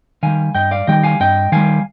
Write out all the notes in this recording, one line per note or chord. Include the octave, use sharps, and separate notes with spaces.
D#3 G3 F5 G#5
G2 D#5 G5
D5 F5
D#3 G3 D#5 G5
F5 G#5
G2 D#5 G5
D#3 G3 F5 G#5